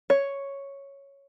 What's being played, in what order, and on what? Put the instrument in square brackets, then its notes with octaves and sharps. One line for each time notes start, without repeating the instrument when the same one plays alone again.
[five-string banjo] C#5